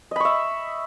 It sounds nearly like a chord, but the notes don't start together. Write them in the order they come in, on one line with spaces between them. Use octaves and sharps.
D#5 B5 C#6 E5